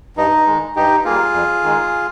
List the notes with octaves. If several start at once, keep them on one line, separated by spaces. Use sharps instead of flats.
G2 D#4
D#3 G#3
G2 D#4 G4
G3 A#3 F4 G#4
F2
D#3 G#3